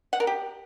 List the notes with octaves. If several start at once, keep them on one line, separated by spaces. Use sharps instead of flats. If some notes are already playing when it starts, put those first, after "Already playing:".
F#5
A#4
G4